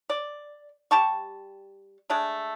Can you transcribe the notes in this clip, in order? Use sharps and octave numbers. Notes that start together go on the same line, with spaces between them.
D5
G3 G4 A5 C#6
G#3 A3 D4